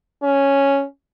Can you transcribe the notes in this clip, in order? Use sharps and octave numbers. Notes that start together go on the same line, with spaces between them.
C#4